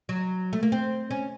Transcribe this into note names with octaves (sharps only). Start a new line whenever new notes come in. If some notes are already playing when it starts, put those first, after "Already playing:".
F#3
A3
A#3
C4
C#4